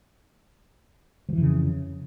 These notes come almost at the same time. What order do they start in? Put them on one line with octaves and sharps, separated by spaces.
F3 E3 F2 C#3